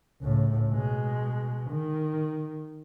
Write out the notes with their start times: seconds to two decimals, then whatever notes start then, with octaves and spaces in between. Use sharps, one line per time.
0.22 C#2 A2
0.69 B2 G#3
1.70 D#3